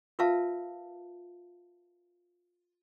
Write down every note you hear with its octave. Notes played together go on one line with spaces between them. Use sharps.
F4 A#4 B4 E5 F5 A5